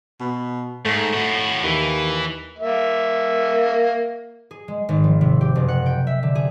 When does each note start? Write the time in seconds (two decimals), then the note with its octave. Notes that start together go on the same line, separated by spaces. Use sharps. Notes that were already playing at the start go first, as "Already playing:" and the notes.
0.20 B2
0.85 G#2 A3
1.13 A2 F#4
1.63 D#2 E3
2.59 A#3 E5
4.51 G#4
4.68 G#3
4.89 G#1
5.04 F3
5.21 C3
5.41 G4
5.55 F#1
5.68 F#5
5.86 G5
6.07 E5
6.23 D3
6.35 G#4